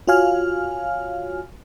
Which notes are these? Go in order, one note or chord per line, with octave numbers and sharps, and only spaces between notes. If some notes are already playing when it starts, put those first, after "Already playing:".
F4 F#4 C#5 F5 G#5 F6